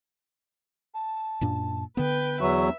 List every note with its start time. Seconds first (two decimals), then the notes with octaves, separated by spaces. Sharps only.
0.94 A5
1.41 F#2 A#2 D4
1.97 D3 B3 B4 G5
2.41 E2 F#3 E5 C#6